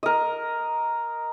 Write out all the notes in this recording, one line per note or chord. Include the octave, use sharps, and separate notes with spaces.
A#4 D#5